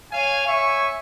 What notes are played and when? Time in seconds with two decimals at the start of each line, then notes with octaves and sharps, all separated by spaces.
0.12 C#5 F5 G#5
0.47 C#5 E5 G#5 C#6